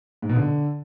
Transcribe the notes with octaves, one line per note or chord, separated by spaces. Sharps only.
G#2
B2
D3